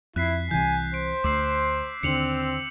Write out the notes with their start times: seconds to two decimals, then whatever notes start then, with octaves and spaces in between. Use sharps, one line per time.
0.16 F2 E4 F#6 B6 C7
0.51 C2 C3 E3 G#5 G6
0.94 C5 D7
1.24 D2 D6 E6 C7
2.03 D#2 D3 C4 C#7 F7 F#7